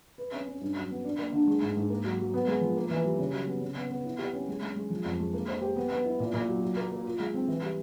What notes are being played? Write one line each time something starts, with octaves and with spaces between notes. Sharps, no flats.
B4
C#4
C#4
G2
F#3
B3
D4
A#3
D3
G#3
G#2
G#2
A#3
F#3
F#3
B3
G#3
F3
A#3
E3
G3
C#3
F#3
B3
C#3
B3
B3
E4
G4
C#4
G#3
G#3
G#3
F3
F2
G#3
A#3
C5
G4
B3
B3
E4
A#2
A#2
F#3
F#3
A#3
A#3
F4
G#3
C4
E3
G3